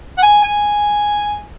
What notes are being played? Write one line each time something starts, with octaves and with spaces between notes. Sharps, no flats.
F#5
G#5
G#5